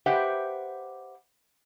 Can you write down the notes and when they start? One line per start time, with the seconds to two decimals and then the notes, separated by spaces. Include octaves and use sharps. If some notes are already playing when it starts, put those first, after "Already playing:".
0.06 G4 B4 C5 E5 F#5 G5